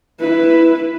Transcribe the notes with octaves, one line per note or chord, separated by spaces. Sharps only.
E4 B4